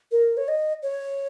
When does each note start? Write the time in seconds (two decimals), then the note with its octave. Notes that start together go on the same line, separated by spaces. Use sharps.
0.12 A#4
0.37 C#5
0.48 D#5
0.83 C#5